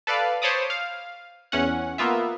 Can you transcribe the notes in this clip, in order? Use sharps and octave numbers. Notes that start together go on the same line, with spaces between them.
A4 B4 D5 F5
C5 C#5 A5 B5 D6 D#6
F5
E2 C#4 F#5
A#3 B3 F4 E5